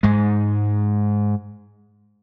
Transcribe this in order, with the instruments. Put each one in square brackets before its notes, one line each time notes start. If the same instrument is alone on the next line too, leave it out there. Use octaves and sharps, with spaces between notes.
[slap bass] G#2 G#3